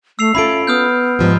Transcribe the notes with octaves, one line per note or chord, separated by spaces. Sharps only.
A3 E6 C7 F7
C#4 F4 A4 E5 B5 G#6 D7
B3 D#6 F6 G6
G#2 F3 G3